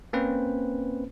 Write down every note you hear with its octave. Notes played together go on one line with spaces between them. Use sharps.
A#3 C4 C#4 B4 C5